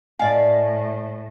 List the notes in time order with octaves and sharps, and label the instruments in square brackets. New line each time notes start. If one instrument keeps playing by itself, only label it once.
[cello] A2 [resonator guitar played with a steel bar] D5 F5 [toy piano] D#5 G#5